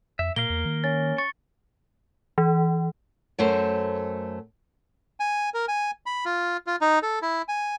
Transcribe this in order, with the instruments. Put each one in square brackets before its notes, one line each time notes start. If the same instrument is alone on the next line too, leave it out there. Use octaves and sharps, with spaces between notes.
[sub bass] F2 [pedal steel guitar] E5
[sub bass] A#2 [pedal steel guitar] A#3 A#4 F5 [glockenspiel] G7
[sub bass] E2
D#3
[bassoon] C#4 [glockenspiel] A6
[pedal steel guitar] C#6 [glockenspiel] A6
[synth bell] E3
[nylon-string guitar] F#2 A3 C5
[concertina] G#5
A#4
G#5
B5
F4
F4
D#4
A4
E4
G#5